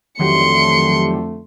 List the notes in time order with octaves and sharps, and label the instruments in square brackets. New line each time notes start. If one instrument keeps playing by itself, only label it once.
[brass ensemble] F2 D3 A3 [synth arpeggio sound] D#3 F#3 G4 [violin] C6 C#7